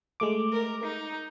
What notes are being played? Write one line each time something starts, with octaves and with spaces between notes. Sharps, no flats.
G#3 A3 D6
A#4
D#4